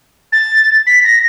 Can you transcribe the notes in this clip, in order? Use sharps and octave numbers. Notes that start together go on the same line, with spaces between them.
A6
B6
A#6